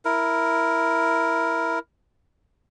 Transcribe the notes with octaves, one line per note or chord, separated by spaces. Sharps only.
E4 A#4